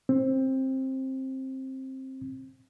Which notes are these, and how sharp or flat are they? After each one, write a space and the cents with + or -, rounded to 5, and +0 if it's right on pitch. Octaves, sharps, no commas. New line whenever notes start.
C4 +15